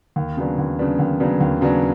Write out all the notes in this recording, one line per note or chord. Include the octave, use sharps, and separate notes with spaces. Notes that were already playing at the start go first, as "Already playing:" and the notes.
D#2
C#3 F#3 B3 D4
D#2
C#3 F#3 B3 D4
D#2
C#3 F#3 B3 D4
D#2
C#3 F#3 B3 D4